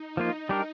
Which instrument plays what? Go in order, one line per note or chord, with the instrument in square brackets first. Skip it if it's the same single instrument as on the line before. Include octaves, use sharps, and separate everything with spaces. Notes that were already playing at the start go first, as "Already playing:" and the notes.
Already playing: [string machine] D#4
[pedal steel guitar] F3 A#3 F4
G3 D4 G4 A#4